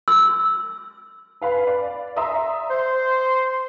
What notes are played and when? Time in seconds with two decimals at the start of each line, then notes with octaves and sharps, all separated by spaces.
0.08 E6
1.41 B4 F5 B5
1.67 D5
2.16 D5 E5 A#5 C6 D#6 E6
2.70 C5 C6